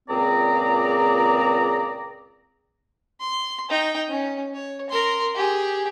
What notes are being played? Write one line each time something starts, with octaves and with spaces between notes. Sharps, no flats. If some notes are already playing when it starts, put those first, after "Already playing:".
C#2 A#2 C4 G#4 D5 A#5
C6
D#4 G5
C#4
C#5
A#4 C6
G4 G#4